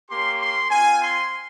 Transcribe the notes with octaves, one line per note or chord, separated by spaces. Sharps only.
A#3 C#4 G4 C6
C6
C4 F4 G#5
C6